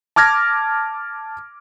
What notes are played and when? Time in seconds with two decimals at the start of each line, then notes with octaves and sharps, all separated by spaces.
0.16 A5 D6 F6 G#6 A#6